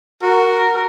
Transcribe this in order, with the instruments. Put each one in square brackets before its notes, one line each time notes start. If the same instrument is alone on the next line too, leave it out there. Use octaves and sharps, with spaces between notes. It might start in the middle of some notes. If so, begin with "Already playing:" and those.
[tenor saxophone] F#4 [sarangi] A#4